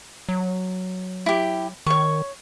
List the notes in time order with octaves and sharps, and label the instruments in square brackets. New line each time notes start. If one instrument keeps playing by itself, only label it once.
[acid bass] F#3
[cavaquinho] E4 G4
[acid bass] D#3 [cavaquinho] C#5 C#6